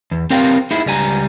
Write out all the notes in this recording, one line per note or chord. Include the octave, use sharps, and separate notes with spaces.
E2
C4 G4 A#4 F5 G5
D#4 E4 G#4
C#2 G3 G#5 A#5